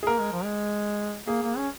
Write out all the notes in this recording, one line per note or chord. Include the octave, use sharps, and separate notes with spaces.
G#4
A#3 A#4
G#3
F3
G#3
A#3 G#4
A#3
C#4